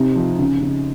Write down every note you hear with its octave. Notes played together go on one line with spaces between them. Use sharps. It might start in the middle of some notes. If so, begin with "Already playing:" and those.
Already playing: C3 D#4
F3
C#3
C#3